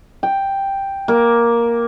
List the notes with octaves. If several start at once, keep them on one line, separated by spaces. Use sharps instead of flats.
G5
A#3